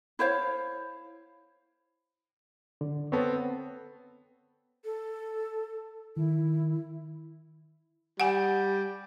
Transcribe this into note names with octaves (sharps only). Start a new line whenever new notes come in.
E4 C5 C#5 F5
D3
B3 C4 A4 B4 C#5
A4
D#3 E4
G3 F#5 G#5